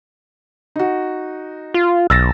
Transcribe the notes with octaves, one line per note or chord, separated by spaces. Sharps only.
D#4 F#4
F4
B1 E6 A6 A#6